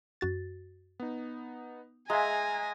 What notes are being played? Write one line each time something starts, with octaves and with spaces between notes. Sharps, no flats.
F#2 F#4 A6
B3 D#4
G#3 E5 F5 G#5 A#5 A#6